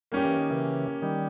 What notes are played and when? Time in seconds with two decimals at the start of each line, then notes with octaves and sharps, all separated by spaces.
0.12 G3 A#3 C#4 G4
0.25 E3
0.38 D#3
0.50 C#3 E3
1.02 D#3 G3